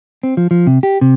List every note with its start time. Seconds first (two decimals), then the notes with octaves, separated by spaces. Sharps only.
0.23 C4
0.37 F3
0.51 F3
0.67 C3
0.83 G4
1.01 C3